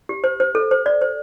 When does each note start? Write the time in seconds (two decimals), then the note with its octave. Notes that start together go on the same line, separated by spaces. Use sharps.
0.09 G4
0.24 C5
0.40 C5
0.55 A4
0.71 C5
0.86 D5
1.01 C5